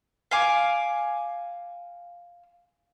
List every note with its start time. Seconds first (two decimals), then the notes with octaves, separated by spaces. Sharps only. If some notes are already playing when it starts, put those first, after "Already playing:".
0.31 F5 G#5 D6